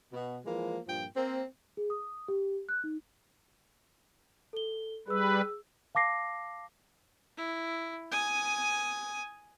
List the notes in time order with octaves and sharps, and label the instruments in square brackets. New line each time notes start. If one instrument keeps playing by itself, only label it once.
[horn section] B2
E3 F3 G#3 A#3
G2 A#2 F3 G5
A#3 C4
[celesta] G#4
D#6
G4
F#6
D#4
A4 G7
[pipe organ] G3 B4 [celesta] G#4 E6
[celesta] F5 A5 D6 A#6 C7
[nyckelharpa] E4
G#5 D#6